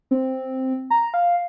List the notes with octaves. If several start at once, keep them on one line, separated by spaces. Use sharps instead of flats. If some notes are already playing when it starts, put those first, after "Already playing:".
C4
A#5
F5